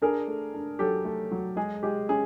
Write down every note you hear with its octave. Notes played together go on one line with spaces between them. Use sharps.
D4 G#4 A#4
A3
D4
F#3 G4 A4
A3
F#3
G#3 G#4
G#3 G4
C#4 G#4